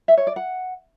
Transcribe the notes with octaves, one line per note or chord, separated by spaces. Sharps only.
E5
C#5
D5
F#5